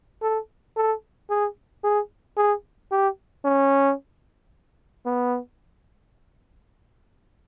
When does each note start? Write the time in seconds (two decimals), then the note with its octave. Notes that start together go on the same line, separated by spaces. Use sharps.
0.22 A4
0.77 A4
1.30 G#4
1.84 G#4
2.37 G#4
2.92 G4
3.45 C#4
5.06 B3